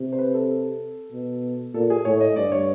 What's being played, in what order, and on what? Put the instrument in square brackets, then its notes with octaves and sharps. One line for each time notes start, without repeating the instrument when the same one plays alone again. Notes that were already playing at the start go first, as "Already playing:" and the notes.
Already playing: [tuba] C3
[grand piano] C5
B4
A4
[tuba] B2
[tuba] A#2 [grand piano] A4
[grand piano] G#4
[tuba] A2 [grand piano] C#5
[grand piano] D#5
[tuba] G2 [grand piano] D5
[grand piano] C#5